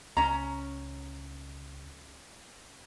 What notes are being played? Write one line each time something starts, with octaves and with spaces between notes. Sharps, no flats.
C#2 C#4 A#5